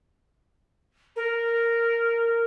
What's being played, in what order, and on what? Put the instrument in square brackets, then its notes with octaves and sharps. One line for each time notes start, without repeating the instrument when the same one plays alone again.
[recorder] A#4